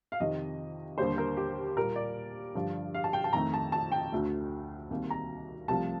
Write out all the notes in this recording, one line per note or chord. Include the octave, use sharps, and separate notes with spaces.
F5
F2 C3 D#3 D#5
D#2 D3 G3 A#3 C5
A#4
G4
A#2 G3 A#3 A#4
D5
G2 D3 F3
F5
A5
G5
A5
F2 D#3 A3 A#5
A5
A5
G5
D2 D3 A3
C2 C3 D#3 A#3
A#5
C2 C3 F3 A3 A5